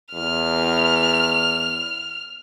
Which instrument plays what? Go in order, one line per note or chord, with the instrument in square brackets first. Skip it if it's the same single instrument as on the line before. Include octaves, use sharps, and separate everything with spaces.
[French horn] E2 [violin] F6